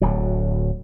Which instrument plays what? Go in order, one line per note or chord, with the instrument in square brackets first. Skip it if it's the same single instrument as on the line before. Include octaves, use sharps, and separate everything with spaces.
[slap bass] D1 D2 F#3